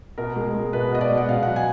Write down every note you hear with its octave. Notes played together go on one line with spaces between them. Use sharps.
B2 A#4
G#3
G#3
B2 B4
B2 D#5
D5
G#3
F#5
B2 F5
F#3 F#5
G#5